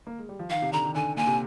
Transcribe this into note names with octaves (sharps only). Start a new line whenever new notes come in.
A#3
G#3
G3
F3
D#3 F5
C3
D3 A#5
D#3
D3 G#5
A#2 G#5
C3